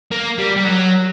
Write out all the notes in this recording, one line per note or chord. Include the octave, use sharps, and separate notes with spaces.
A#3
G3
G3
F#3